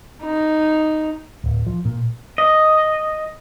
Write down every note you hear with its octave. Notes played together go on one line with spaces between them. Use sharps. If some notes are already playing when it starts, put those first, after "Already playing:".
D#4
D1
F3
A#2
D#5